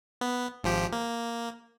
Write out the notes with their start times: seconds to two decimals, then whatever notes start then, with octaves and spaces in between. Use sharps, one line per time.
0.21 B3
0.64 G#1 F3 G4
0.93 A#3